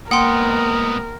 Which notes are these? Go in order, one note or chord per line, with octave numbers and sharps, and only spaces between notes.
G#2 A#3 B3 A#4 F#5 G5 C6